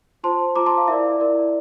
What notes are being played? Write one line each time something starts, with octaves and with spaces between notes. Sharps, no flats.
F4 C5 A5 C6
F4 C5 A#5 D6
A5 C6
F5
E4 A#4 D5 E5
E4 A#4 D5